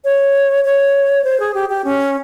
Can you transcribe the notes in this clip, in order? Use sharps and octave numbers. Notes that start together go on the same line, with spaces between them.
C#5
C#5
C5
G#4
G4
G4
C#4